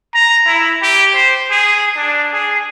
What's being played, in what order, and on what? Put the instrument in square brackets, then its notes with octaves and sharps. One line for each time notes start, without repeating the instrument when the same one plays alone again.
[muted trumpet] A#5
E4
G4
C5
G#4
D4
G#4